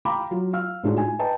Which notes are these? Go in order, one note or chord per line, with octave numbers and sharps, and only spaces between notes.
F5 G5 A#5 B5 D6
F#3 F4
F5 E6 F6
A2 G#3 D4 D#4 F4 F#4
G#5
B4 D#5 G5 A5 A#5